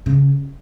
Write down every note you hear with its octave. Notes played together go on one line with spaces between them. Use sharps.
C#3